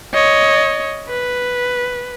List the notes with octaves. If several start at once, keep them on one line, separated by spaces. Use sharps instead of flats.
C#5 D#5
B4